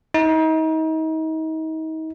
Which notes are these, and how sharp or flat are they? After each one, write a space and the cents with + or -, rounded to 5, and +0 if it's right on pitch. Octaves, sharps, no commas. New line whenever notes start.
D#4 +35